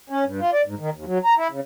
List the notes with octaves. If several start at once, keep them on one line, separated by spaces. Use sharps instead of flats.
C#4
G2
F4
D5
G#2
D#3
D#2
F#3
A#5
E4
C#3